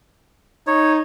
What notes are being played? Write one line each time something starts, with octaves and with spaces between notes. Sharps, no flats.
D#4 C#5